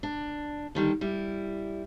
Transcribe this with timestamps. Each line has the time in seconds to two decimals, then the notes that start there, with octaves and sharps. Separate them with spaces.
0.03 D4
0.75 D3 D#3 G3
1.01 G3 E4